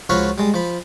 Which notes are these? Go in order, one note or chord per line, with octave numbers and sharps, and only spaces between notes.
C#2 F3 F#4 C#5 F5 B5
G3 G#3
F3 B5